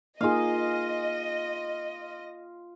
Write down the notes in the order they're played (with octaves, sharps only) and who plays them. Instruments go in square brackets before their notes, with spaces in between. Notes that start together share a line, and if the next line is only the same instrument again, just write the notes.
[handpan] A#3 D#4 G#4 [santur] F4 F5 [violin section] D#5